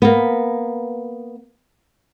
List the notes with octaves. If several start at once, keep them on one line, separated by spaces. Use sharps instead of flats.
A#3 B3